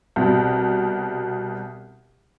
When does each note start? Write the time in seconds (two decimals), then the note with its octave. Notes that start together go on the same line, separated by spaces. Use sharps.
0.16 C2 B2